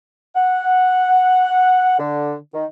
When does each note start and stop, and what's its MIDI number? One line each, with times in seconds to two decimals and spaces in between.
0.36 1.97 78
1.99 2.35 50
2.54 2.65 51